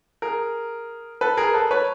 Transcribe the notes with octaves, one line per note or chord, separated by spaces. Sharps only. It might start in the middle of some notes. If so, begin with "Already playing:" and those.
G#4 A#4
A4 B4
G#4 A#4
A4 B4
B4 C#5